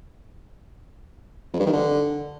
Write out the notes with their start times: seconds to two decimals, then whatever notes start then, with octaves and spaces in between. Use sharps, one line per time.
1.53 F2
1.60 G2
1.66 D#3
1.73 D3